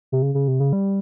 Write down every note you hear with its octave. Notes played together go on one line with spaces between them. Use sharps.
C3
C#3
C#3
C3
C#3
G3